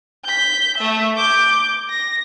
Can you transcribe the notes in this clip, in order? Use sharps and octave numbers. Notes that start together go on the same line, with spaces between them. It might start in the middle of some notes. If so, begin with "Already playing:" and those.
G6 B6
A3 E5
D6 G6
A#6